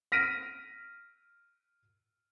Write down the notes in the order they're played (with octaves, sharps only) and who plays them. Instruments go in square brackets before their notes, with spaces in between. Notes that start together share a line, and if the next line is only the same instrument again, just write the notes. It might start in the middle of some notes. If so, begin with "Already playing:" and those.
[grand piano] F6 A#6 B6 D7 D#7